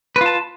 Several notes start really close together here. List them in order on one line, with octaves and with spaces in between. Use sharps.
B4 F4 A5